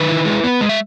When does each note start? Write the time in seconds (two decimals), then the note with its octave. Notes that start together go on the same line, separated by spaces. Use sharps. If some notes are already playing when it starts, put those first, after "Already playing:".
Already playing: D#3 B4
0.09 E4
0.25 G#3
0.44 B3
0.61 G#3
0.69 E5